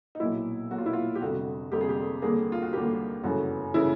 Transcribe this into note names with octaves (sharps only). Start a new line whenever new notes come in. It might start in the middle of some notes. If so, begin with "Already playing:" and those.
D#4
B1 A#2 F#3 E4
B1 A#2 F#3 F#4
F4
E4
F4
G4
F1 F2 D3 G3 F#4
F1 F2 D3 G3 G4
G#4
G4
D#2 D3 G3 A#3 G#4
F4
F#4
D#2 D3 G3 A#3 G4
G1 F#2 C#3 E3 A3 F#4
C#3 E3 A3 E4